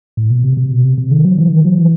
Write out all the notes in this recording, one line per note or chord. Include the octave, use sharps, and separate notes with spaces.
A2
B2
C3
C3
B2
C3
C3
D#3
F#3
E3
D#3
F#3
E3